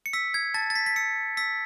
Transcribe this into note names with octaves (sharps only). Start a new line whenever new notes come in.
C#7
E6 B6
G#6
A5 A6
A6
B6
B6
E6 C#7
E6 B6